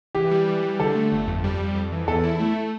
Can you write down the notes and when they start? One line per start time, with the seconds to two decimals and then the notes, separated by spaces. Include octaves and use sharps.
0.15 E3 G4
0.31 G3
0.47 E3
0.63 G3
0.80 D3 A4
0.95 A3
1.12 G1
1.27 F2
1.44 G3
1.60 F2
1.75 F2
1.92 E3
2.08 E2 A4
2.23 E4
2.40 A3